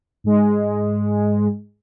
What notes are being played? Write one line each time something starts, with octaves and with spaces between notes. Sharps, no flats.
G#2 G#3